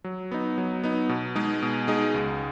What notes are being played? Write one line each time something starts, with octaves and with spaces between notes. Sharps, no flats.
F#3
B3 D#4
F#3
B3 D#4
B2
G#3 D#4 G#4
B2
G#3 D#4 G#4
C#2